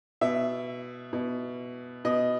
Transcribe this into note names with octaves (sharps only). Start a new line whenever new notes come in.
B2 E5
B2
B2 D#5